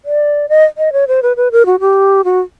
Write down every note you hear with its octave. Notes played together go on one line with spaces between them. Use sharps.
D5
D#5
D#5
C#5
C5
B4
B4
A#4
F#4
G4
F#4